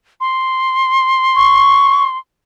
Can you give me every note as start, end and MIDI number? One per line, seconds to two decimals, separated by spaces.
0.20 2.18 84
1.35 2.03 85